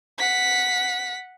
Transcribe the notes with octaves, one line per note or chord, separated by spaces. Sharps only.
F#5 B6